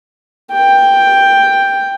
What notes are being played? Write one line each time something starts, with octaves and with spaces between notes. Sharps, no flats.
G5